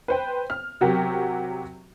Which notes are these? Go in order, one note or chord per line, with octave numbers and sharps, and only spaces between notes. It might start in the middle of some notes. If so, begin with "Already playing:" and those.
B4 C5 G5
F6
C3 F#3 F#4 G4 A#4